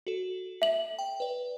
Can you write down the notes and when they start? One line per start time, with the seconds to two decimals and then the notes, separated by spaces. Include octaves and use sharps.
0.07 F#4 A4
0.62 E5 F#7
0.99 G5
1.20 B4 D5